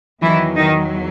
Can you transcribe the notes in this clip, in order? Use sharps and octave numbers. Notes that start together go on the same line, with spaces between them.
E2 D#3 E3 F#3 E4
D#3 D#4